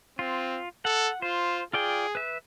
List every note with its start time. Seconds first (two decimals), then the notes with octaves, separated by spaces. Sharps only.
0.19 C4 F4
0.85 A4 F#5
1.22 F4 C5
1.73 F4 G#4 D5 G5
2.15 B4 E5